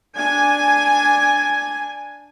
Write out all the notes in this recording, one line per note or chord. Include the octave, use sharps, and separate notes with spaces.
D4 G#5